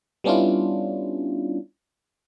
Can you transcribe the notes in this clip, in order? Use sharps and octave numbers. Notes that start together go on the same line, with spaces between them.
G3 B3 C#4 D4 E4 F4